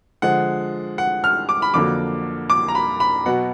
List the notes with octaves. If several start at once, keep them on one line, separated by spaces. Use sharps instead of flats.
D3 F3 G#3 F#5
F#5
F6
D6
B5
F2 D3 F#3 A#3 D6
D6
A#5
B5
B5
B2 F#3 B3 F#5